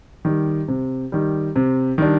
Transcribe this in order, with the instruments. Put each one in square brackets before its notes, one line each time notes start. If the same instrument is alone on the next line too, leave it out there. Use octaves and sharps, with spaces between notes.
[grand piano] D#3 G3
C3
D#3 G3
C3
D#3 G3 D4